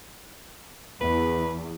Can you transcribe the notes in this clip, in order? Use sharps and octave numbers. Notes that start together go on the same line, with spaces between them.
E2 B4